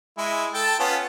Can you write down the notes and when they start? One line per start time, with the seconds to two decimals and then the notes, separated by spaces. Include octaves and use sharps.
0.18 G#3 E4
0.54 A4 G5 A5
0.80 B3 C#4 F4